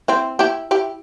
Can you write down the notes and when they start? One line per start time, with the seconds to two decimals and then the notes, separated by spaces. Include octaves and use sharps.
0.08 C4 E4
0.39 E4 G4
0.71 E4 G4